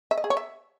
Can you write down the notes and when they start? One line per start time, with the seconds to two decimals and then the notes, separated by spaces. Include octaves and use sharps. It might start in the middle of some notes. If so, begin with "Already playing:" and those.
0.11 E5
0.18 D#5
0.24 G#4
0.30 C#5
0.37 E5